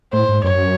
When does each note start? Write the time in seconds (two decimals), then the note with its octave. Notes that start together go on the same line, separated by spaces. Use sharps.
0.13 A2 C5
0.29 G#2
0.44 F#2 C#5